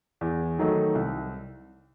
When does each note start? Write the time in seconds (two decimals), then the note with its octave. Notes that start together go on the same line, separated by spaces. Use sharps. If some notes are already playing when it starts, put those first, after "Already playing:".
0.21 E2
0.59 D#3 F#3 A3 D#4
0.95 C2